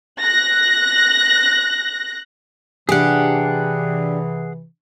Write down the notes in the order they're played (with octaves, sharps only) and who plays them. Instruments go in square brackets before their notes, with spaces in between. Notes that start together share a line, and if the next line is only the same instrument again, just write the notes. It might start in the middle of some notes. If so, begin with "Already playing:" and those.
[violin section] F#6 A#6
[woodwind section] C3 E3 [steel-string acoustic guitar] D4 G4 [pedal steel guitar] G#4 F#5